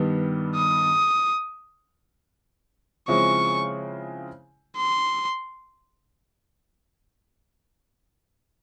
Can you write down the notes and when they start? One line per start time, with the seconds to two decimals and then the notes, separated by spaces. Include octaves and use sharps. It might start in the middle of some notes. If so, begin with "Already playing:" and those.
Already playing: G2 D#3 G3 B3
0.56 D#6
3.08 C#3 F3 G#3 C4 E4 C#6
4.77 C6